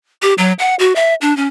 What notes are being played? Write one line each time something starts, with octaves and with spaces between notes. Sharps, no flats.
G4
F#3
F#5
F#4
E5
D4
C#4